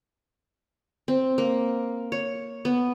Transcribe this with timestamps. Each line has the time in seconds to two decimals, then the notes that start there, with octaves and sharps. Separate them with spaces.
1.08 C4
1.38 A#3
2.12 C#5
2.65 B3